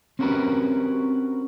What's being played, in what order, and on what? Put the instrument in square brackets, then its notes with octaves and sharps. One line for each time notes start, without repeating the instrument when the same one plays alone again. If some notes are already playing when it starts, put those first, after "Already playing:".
[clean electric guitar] C4 C#4 F#4 G4 A#4 B4